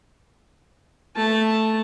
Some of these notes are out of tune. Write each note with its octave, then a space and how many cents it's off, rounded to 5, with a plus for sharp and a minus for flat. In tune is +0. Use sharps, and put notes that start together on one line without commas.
A3 +0 A5 +0